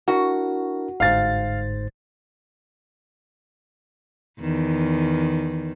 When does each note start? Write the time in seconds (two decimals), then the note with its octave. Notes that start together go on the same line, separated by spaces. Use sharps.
0.08 D4 E4 F#4 A#4
1.00 G1 G#2 C5 F5 A6
4.40 E2 D#3